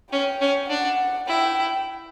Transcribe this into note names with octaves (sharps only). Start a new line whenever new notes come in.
C#4 G5
C#4
D4 F#5
E4 G5